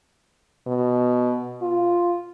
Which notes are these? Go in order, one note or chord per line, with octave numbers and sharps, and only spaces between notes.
B2
F4